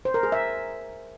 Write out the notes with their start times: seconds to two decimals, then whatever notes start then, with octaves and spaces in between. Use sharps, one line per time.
0.05 C5
0.14 A#4
0.23 G#4
0.32 E5